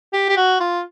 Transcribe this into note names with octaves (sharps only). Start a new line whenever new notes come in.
G4
G4
F#4
F4